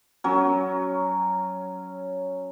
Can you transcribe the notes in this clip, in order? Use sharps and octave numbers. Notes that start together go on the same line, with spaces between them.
F#3 C#4